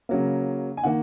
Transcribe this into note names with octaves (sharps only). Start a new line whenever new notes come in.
C#3 F#3 A#3
G#5
D#3 A#3 F#5